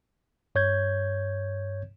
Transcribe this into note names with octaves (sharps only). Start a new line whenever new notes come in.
G2 C#5 G6 G#6